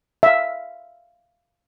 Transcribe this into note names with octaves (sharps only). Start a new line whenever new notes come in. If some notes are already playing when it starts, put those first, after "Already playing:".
E5 F5